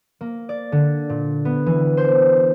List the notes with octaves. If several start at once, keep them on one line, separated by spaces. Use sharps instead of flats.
A#3
D5
D3
A#2
B3
E3
C5